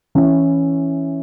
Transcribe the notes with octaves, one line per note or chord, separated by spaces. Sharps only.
E3 C#4 E4